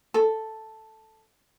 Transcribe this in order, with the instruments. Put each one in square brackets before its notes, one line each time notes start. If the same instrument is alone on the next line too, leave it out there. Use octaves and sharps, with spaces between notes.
[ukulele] A4